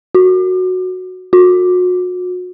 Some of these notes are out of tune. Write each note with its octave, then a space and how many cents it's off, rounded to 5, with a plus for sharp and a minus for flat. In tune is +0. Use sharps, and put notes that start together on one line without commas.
F#4 -5
F#4 -35